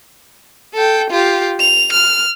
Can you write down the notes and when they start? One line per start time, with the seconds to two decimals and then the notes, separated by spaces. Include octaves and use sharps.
0.74 A4 G5
1.11 F4 G4
1.60 F7
1.93 F6